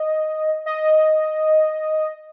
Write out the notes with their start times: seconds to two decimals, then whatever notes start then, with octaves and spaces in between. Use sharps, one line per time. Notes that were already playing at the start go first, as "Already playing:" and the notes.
Already playing: D#5
0.66 D#5